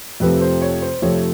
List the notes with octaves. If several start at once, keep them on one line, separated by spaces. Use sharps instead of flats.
F2 C3 F3 A3 B4
C5
C#5
C5
F2 C3 F3 A3 C#5